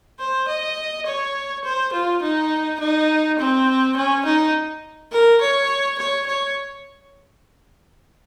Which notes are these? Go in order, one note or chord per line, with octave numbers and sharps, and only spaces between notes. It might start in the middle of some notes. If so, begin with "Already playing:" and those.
C5
D#5
C#5
C5
F4
D#4
D#4
C4
C#4
D#4
A#4
C#5
C#5
C#5